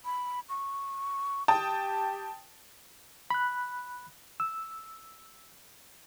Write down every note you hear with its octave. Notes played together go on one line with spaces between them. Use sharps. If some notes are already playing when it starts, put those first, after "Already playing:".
B5
C#6
G4 G5 A5 D#6
B5 F#6
E6